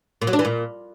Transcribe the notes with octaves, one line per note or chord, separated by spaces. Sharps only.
A#2
F#3
D4
E3
A#2